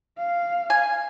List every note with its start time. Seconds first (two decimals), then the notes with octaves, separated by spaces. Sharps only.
0.18 F5
0.70 G#5